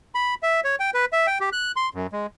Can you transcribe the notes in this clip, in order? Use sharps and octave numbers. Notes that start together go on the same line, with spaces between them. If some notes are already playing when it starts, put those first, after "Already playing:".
B5
E5
C#5
G5
B4
E5
G5
G4
F#6
C6
F#2
G#3